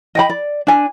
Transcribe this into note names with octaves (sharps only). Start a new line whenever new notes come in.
D#5 G5 B5
D5
D4 G#5